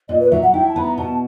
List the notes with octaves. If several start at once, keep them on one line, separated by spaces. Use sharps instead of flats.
A#2 D#5
B4
F#3 E5
F#5
E4 G5
A5
B3 B5
A#5
B2 A5